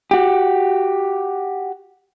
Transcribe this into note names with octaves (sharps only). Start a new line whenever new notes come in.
F#4 G4